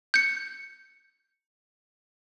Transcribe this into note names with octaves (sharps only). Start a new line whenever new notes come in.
G6 C#7